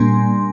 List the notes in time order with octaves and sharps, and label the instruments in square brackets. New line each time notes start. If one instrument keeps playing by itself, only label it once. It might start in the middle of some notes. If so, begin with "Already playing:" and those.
Already playing: [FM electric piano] A#2 G3 A#3 D4 G#5 C6